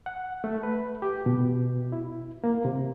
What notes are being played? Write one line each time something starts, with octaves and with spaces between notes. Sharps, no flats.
F#5
A3
B4
G4
B2
E4
A#3
C3